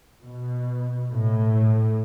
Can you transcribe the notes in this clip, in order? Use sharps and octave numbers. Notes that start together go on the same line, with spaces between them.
B2
A2